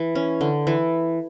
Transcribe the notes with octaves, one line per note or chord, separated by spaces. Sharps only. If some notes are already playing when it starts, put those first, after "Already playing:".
Already playing: E3
C#4
D3
E3